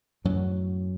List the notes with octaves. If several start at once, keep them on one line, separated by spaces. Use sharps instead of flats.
F#2 A2 F#3